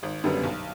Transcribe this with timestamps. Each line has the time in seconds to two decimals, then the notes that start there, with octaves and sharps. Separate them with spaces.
0.03 G#1
0.24 F#2 D3 G3 B3
0.43 B1